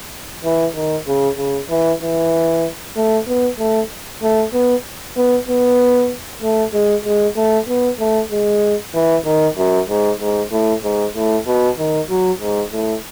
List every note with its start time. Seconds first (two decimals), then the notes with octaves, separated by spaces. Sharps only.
0.44 E3
0.75 D#3
1.07 C#3
1.38 C#3
1.70 E3
2.02 E3
2.96 A3
3.27 B3
3.59 A3
4.22 A3
4.53 B3
5.17 B3
5.48 B3
6.42 A3
6.73 G#3
7.05 G#3
7.36 A3
7.68 B3
8.00 A3
8.31 G#3
8.94 E3
9.26 D#3
9.58 F#2
9.89 G#2
10.20 G#2
10.52 A2
10.84 G#2
11.16 A2
11.47 B2
11.79 D#3
12.10 F#3
12.41 G#2
12.73 A2